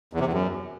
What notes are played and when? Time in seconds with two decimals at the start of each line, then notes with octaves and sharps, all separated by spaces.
0.13 E2
0.20 C3
0.26 E2
0.33 F#2